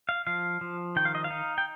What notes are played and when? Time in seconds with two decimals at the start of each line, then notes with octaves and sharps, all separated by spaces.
0.09 F5
0.27 F3 F5
0.61 F3
0.96 D#3 G5
1.05 F5
1.15 D#5
1.24 F5
1.30 D#4
1.58 G5